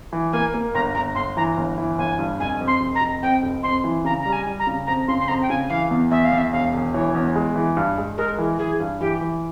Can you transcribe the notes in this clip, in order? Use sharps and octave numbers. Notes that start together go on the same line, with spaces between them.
E3
A#3 G#5
A#3
G1 A#5
G1 A#5
G1 C6
E3 A#5
G1
E3
G1 G#5
G2
F1 G#5
F2
C6
F1
A#5
F1
F2 G5
F1
F2 C6
E3
C#3 A#5
G3 A#5
G#5
G3
A#5
C#3
F2 A#5
C#3 C6
C6
F2 A#5
G5
C#3 G#5
E3 F5
E2
E2 E5
F5
E2
E5
E1 F5
E1
E3 C#5
E2
G#3
E3
G2
G#3
G#3 A#4
E3
E3 G#4
G2
E3 G4
E3